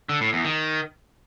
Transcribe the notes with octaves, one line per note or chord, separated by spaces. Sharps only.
D3
A2
E2
D#3